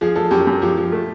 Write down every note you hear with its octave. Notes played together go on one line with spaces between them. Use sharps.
F3 G#4
F3 A4
F#2 G4
F#2
F3 G4
F3
A3